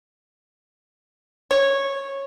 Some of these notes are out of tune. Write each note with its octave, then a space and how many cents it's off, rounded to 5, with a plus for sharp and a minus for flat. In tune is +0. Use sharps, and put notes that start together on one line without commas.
C#5 -15